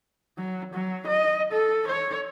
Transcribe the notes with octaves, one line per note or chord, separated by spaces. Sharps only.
F#3
F#3
D#5
A4
C#5